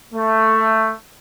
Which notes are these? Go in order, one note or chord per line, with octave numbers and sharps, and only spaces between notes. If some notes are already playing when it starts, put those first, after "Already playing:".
A3